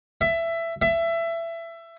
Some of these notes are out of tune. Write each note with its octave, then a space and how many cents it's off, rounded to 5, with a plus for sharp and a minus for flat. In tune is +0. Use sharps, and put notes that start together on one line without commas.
E5 +15
E5 +20